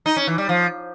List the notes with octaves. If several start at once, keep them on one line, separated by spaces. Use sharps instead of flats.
D#4
C#4
E3
G3
F3